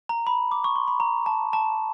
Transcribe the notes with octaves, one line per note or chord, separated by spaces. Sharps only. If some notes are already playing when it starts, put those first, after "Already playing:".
A#5
B5
D6
C#6
C6
B5
A#5
A5
A5